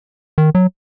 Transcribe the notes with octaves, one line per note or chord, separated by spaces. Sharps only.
D#3
F#3